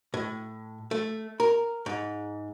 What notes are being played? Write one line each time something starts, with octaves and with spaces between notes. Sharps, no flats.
A2
A3
A#4
G#2